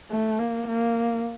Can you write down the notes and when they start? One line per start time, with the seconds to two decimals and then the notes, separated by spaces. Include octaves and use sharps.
0.10 A3
0.39 A#3
0.68 A#3